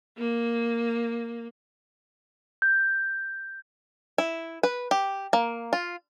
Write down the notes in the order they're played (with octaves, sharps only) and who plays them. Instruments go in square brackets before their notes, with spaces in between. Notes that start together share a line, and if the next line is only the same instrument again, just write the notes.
[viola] A#3
[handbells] G6
[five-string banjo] E4
B4
G4
A#3
F4